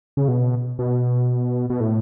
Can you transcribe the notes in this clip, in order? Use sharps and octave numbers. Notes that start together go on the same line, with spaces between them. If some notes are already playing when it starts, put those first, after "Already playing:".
C#3
B2
B2
B2
A2